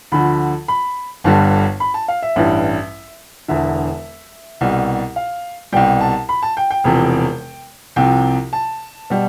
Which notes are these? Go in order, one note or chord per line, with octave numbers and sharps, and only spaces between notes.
D2 D3 F3 B5
B5
G1 G2 D3 G3 A5
B5
A5
F5
E5
A1 G2 E3 G3
E1 E2 D3 E5
C2 B2 G3
F5
C2 B2 G3 G5
A5
B5
A5
G5
G5
E1 E2 C3 F3
C2 C3 F3 G5
A5
B2 G3